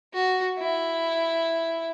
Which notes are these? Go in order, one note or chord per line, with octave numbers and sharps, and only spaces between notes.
F#4
E4